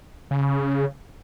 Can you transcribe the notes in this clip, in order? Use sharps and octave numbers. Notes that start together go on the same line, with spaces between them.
C#3